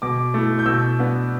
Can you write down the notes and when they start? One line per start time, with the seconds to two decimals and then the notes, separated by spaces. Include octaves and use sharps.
0.02 B2 D6
0.34 A3 E4
0.59 G6
0.66 B2 E6
0.99 B3 D4